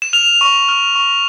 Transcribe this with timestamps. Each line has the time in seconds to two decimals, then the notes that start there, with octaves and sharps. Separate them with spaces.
0.02 E7
0.13 F6 F7
0.41 C#6
0.69 F6
0.95 C#6